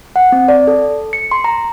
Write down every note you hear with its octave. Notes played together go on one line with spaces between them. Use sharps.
F#5
C4
D5
A4
C#7
C6
A#5